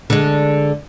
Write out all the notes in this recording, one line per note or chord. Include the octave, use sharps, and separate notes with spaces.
D3 G#3